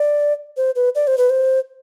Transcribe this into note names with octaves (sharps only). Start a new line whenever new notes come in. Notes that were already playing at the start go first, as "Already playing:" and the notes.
Already playing: D5
C5
B4
D5
C5
B4
C5